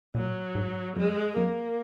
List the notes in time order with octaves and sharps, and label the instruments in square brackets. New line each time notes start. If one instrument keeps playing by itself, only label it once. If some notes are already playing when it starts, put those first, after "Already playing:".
[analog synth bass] A#2 [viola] F#3
[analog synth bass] G#2
[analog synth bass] F#2 [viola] G#3
[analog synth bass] F#2 [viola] A#3